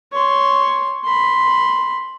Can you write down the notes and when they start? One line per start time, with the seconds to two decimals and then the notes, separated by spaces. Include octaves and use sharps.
0.13 C#5 C6
1.05 B5 C6